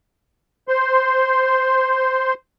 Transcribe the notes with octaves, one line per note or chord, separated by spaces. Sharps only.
C5 C6